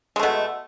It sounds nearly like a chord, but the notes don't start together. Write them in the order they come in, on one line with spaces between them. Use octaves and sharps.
G#3 A3 B2